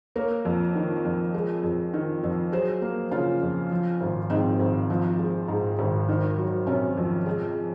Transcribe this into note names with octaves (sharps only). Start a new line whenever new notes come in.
A#3 A#4 C#5
F2
D#3
F2
G#3
F2
D#3
F2
F#3 G#4 C5
A#3
C#3 C#4 F4
F2
F3
G#1
G#2 C4 D#4
G#1
F3
G#3
G#2
G#1
D#3
F#3
C3 C#4
F2
G#3